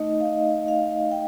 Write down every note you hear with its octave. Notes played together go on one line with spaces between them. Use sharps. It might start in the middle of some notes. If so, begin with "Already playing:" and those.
Already playing: A3 D#4 D#5
F5
D#5
F5
G5